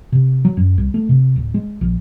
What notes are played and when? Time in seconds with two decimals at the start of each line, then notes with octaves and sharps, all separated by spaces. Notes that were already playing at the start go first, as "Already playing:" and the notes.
0.12 C3
0.45 F#3
0.57 F#2
0.78 C2
0.94 A3
1.09 C3
1.36 D1
1.54 G#3
1.81 A#1